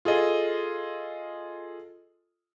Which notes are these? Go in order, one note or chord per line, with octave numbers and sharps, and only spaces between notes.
F4 G#4 A4 D#5